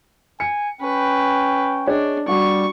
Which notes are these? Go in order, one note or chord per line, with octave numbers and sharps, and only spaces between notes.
G#5 C#7
C#4 B4 G5
D4 G#4 C#5 D#5
G3 D4 F#4 C#6